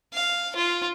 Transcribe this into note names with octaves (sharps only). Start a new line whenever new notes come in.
F5
F4